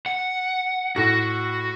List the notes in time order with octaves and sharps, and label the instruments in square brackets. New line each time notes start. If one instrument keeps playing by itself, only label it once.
[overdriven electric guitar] F#5
[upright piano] A2 A#6 [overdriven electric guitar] F#4